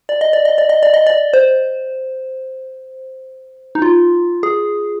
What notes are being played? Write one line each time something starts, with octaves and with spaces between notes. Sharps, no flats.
D5
D#5
D5
D#5
D5
D#5
D5
D#5
D5
C5
D#4
F4
G#4